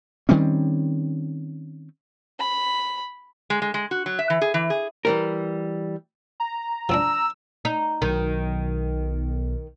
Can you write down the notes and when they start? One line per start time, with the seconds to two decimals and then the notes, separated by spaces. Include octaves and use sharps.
0.29 D#3 G3 C4 C#4
2.39 B5
3.50 G#3
3.62 G#3
3.74 G#3
3.91 F#4
4.06 F#3
4.19 E5
4.30 E3
4.41 G#4
4.54 E3
4.70 G#4
5.05 E3 G3 A#4
6.40 A#5
6.89 F3 C4 D4 E6
7.65 D#4
8.02 B1 D#3